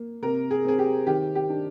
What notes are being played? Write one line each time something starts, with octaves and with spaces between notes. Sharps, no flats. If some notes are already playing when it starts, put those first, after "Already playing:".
Already playing: A#3
C3 A#4
G#4
C4 G#4
G4
D#3 G4
G4
D4